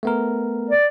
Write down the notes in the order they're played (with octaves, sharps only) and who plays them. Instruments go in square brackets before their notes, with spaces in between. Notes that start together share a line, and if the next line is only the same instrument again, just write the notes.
[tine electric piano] A3 B3 A#4
[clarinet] D5